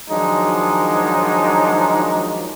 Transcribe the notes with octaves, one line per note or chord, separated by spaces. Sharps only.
D#3 F3 F#3 G#3 D4 D#4